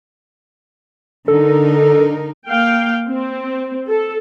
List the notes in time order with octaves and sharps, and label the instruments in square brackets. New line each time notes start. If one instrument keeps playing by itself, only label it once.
[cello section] D3 D#4 A#4 [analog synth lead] A4
[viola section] A#3 F5 G5
C4
A4